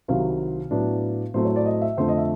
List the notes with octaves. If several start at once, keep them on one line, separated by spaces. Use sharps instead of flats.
C2 C3 D#3 F#3 F5
A2 F#3 B3 D4
A2 F#3 A3 C4 C5
C#5
D5
D#5
E5
F2 D3 F3 A3 C5
D#5
E5